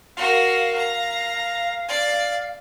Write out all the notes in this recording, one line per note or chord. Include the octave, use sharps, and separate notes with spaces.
F#4 A#4 F5
A#5
D5